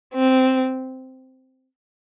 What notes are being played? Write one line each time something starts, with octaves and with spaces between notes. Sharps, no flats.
C4